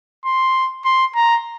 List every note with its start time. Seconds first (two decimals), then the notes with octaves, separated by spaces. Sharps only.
0.25 C6
0.84 C6
1.15 A#5